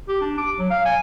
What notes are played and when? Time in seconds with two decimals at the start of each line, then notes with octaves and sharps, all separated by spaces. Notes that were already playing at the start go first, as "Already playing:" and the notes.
0.08 G4
0.21 D4
0.38 D6
0.58 F#3
0.70 F5
0.85 G#5